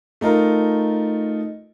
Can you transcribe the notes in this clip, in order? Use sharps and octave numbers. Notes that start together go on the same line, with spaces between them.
A3 D#4 F4 A#4